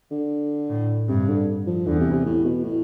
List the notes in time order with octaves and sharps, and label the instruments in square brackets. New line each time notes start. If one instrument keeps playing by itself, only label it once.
[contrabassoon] D3
[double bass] A2
[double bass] G2 [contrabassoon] C3
[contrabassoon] D3
F3
[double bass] E2 [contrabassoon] D3
[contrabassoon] C3
C3
A2
B2
A2